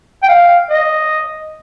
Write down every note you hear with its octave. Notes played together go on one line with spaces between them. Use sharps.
G5
F5
D#5